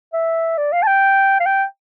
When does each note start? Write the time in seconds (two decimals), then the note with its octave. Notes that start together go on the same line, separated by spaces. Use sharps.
0.13 E5
0.58 D5
0.72 F5
0.83 A5
0.87 G5
1.40 F5
1.46 G5